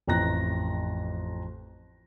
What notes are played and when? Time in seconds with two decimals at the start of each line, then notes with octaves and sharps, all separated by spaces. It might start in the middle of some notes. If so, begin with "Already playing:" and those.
0.07 A1 F2 A#5 F#6 A#6